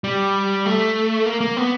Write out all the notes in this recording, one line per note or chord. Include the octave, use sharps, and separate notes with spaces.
G3
A3
A#3
A#3
B3